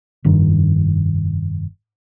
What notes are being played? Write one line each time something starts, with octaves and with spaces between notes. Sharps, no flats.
F1 G2 D#3